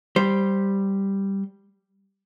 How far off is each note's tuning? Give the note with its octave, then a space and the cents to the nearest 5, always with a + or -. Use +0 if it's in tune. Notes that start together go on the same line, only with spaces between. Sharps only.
G3 +0 C5 +0